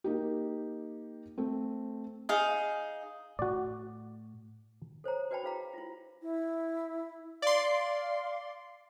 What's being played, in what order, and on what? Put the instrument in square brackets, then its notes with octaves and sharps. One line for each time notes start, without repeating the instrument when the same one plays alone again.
[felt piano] A#3 D#4 G4
A3 C4
[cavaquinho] D#4 G#4 F5
[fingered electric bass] A2 [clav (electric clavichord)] F#4 D5
[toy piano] A4 C5 C#5 A#5
F#4 B4 D5 G5 A5 B5
E4 G#4 F5 A#5
E4 F4
[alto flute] E4
[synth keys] D5 C6 [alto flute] F5